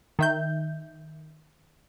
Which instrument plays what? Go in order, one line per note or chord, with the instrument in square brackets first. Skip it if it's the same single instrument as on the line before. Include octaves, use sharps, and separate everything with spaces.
[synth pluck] D#3 E5 G6